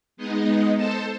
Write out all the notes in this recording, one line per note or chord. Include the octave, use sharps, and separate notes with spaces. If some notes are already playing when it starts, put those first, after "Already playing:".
G#3 B3 D#4 D#5
A4 C5 A5